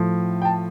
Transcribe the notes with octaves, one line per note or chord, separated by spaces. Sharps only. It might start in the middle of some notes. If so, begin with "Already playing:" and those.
Already playing: A2 F3
G5
A5